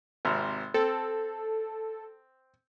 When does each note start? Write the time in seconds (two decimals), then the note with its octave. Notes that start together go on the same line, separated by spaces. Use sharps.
0.25 G#1 C3 A#4
0.74 C4 A4